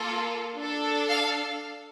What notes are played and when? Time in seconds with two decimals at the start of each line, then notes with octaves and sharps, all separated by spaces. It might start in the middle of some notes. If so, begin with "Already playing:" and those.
Already playing: A#3 F4 A4
0.57 D4 A4
1.10 F5